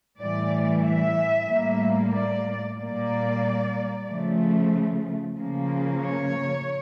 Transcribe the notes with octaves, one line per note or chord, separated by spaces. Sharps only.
A2 E3 G3 D5
E5
A2 G3 A#3
D5
A#2 G3 A#3 D5
C#3 F3 A3
C#3 F3 A#3
C#5